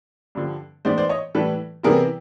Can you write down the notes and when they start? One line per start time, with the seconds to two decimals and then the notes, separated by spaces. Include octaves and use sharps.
0.35 G2 D3 F3
0.85 A2 E3 G#3 B3 D#4 C5 D5
0.98 C5 D5
1.09 C#5 D#5
1.35 A2 E3 G3 A4 B4
1.83 C3 E3 G3 B3 E4 G#4 A#4